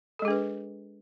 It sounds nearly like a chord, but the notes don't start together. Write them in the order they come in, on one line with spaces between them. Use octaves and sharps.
A4 G#3 G#4 D4 B4